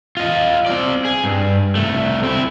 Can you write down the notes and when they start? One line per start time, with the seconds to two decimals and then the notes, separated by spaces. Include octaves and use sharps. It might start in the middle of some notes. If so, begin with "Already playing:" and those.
0.17 F4 D#5
0.66 C4 D5
1.05 G#4
1.24 G2
1.75 C2 A3
2.23 C4 E4